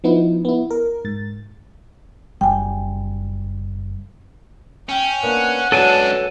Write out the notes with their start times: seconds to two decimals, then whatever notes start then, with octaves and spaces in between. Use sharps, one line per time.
0.04 F3 B3 D#4 E4
0.45 B3 E4
0.71 A#4
1.05 G#2 A6
2.41 F#1 G3 G5 G#5
4.89 C#4 G5
5.23 A#3 B3 D4 F#5
5.72 C#2 F#3 B3 D4 F#4 A4 G#5 A5